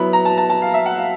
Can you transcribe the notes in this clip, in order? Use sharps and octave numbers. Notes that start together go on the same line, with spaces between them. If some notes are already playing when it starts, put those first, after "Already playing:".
Already playing: F#3 B3 E4 B5
A#5
A5
A5
A5
F5
E5
F#5
F5